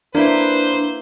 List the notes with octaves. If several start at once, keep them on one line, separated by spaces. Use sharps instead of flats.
A#3 D4 E4 B4 C5